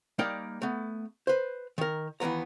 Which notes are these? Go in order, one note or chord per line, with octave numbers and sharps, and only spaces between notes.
G3 A#3 D#4 A#4 D5 G5
A3 B3
B4 C5
D#3 A#4
D#2 E3 G#3 B3 A#5